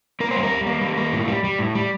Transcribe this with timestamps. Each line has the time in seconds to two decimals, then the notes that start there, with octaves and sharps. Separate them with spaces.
0.20 A#3 A#4
0.31 C5
0.36 G3
0.43 A#4
0.51 G3
0.67 A#3
0.81 G3
0.97 A#3
1.13 A2
1.28 G3
1.44 G3
1.58 A2
1.75 G3